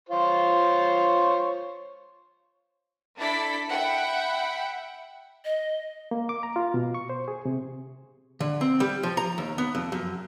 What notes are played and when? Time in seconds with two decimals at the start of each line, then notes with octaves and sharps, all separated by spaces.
0.09 F4 C5 C#5
3.17 D4 E4 A4 D5 B6
3.69 E5 F#5 G5 B5
5.45 D#5
6.11 A#3
6.29 D6
6.43 A#5
6.56 F4
6.74 B2
6.95 C#6
7.09 C5
7.28 G#4
7.45 C3
8.40 D3
8.61 C4
8.80 G3
9.03 F3
9.17 A#5
9.38 D#2
9.58 B3
9.75 F2
9.92 F#2